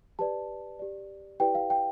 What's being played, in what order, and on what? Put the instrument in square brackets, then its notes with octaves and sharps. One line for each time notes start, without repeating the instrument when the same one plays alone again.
[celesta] G4 B4 D5 A5
G4 D5
E4 G4 B4 D5 G5
F5
G5